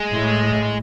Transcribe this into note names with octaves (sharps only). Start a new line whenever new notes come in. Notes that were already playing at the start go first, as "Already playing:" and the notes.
Already playing: G#3
A2